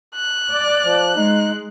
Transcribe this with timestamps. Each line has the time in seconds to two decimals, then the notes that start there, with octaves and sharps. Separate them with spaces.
0.15 F#6
0.51 D5
0.83 F3
1.15 G#3 D#4